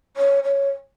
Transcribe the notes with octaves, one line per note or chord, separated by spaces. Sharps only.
C#5
C#5